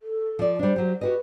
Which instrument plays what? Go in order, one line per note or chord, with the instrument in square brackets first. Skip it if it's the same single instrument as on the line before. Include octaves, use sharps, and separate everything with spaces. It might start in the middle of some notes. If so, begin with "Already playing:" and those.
[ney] A4
[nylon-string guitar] F3 D5
[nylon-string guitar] G3 D4 [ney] C5
[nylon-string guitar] F#3 G4
[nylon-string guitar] F#4 G4 D#5 [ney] B4